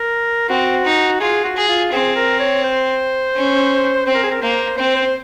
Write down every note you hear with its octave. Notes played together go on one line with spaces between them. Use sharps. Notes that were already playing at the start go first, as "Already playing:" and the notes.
Already playing: A#4
C4 F#4
D#4
F4 G#4
F#4
G#4
F4
C4 G#4
A#4
C#5
C5
C#4
C4 C5
A#4
G#4
A#4
A#3 C5
C4 C5
C5